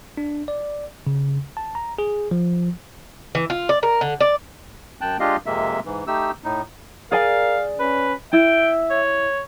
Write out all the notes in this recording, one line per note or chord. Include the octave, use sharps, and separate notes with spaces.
D4
D5
C#3
A5
A#5
G#4
F3
E3
F4
D5
A#4
D3
D5
F#2 G5 A5 F#6
G#3 D4 F4 G4 D#5 F5
F2 C3 G#3 A#3 E5
G#2 E3
A3 D#4 G4 E6
A2 D#4
G#4 A#4 D5 F5 G#5
C#4 B4
E4 E5 G5
C#5